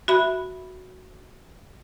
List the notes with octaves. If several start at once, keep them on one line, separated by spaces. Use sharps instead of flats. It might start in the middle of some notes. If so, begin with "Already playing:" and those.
F#4 E5 B5